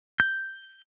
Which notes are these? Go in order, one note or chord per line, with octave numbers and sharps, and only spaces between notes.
G6